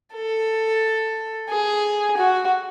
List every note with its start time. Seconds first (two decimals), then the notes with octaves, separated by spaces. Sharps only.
0.15 A4
1.49 G#4
2.17 F#4